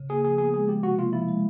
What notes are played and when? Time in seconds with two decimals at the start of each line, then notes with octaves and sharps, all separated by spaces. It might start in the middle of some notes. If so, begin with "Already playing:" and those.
Already playing: C#3
0.09 A#3 G#4
0.24 F3 G#4
0.38 B3 G#4
0.54 G#3 G#4
0.68 F3 G4
0.83 C3 F#4
0.98 A#3 F4
1.13 F3 E4
1.28 G#3